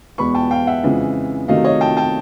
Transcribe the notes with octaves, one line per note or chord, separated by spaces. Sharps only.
E2 B2 G#3 B3 B5 C#6
G5 A5
F5 G5
E5 F#5
F2 C#3 E3 G#3
C3 D#3 F#3 A3 D#5 F5
C#5 D#5
G5 A5
G5 A5